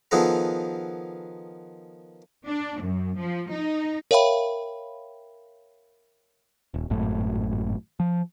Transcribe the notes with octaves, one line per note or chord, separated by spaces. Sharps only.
D#3 F3 B3 G#4 A4 A#5
D4
F#2
F3
D#4
A#4 C#5 E5 F5 G5 B5
D#1
G#1 F#2 A2
F3